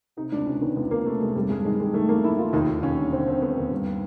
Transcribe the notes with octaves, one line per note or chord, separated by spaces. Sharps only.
C3 D#4
C#2 D4
C3 C#4
D#3 B3
C#2 B3
D#3 A#3
C3 A3
C3 G#3
G2 G3
G2 G#3
D#3 G#3
D#3 G#3
D#3 A3
D#3 A#3
D#3 E4
D#3 F4
D#2 D#4
D#2
D#2 C#4
D3
D3 C4
D3 C4
D3 B3
D#2
G2